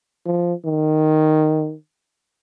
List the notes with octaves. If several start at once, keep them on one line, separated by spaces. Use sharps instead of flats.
F3
D#3